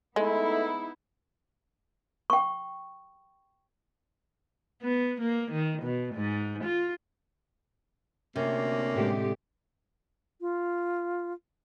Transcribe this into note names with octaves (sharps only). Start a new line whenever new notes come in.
G#3 A3 B3 D#4 E4
G5 C#6
B3
A#3
D#3
B2
G#2
F4
D2 C3 A#3 C#4
A2 D3 G#3 G4
F4